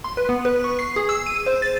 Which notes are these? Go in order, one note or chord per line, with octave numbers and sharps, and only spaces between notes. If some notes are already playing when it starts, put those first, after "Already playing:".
C6
B4
B3
B4
C#6
C7
G#4
E6
D#7
C5
A6